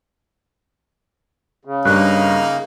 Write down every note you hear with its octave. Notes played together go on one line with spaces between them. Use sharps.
C#3
G2 A#3 D#4 F#6